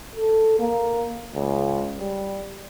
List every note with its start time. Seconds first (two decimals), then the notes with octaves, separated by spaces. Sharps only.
0.16 A4
0.60 A#3
1.34 C#2
1.99 G3